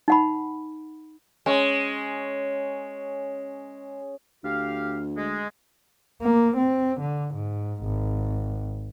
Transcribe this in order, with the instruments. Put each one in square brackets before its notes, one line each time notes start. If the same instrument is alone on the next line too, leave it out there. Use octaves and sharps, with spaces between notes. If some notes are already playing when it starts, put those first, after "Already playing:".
[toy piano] D#4 F#5 B5
[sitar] G#3 [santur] C#4
[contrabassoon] D2 [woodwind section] G4 F5
[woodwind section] G#3
[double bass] A#3
C4
D3
G#2
G#1